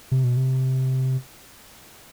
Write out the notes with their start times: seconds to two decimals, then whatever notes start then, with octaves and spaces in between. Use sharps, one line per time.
0.11 C3
0.24 B2
0.37 C3